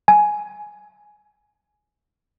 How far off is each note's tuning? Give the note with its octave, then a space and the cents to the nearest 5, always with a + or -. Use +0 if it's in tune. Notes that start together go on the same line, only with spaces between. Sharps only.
G#5 +10